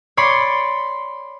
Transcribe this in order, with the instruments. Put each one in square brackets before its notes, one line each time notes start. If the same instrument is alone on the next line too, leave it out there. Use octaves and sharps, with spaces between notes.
[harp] C#5 D5 B5 C6